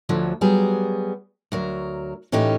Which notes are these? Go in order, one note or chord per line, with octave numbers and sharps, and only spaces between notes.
D2 D3 F3 F#3
F#3 G3 B3 G#4
D2 F#3 A#4
A2 E3 A3 C#4 D#4 G4